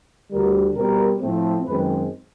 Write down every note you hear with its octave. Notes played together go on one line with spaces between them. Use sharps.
D2 D3 G3 A#4
B2 G3 C4 A#4
A2 F3 A3 C4
F#2 D#3 G#3 C4 B4